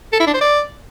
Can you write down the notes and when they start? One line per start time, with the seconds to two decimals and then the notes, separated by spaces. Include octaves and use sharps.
0.13 A4
0.20 E4
0.27 D4
0.34 C5
0.41 D5